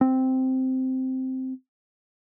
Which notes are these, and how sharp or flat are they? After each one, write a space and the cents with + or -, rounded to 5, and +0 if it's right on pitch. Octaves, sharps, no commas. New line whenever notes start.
C4 -5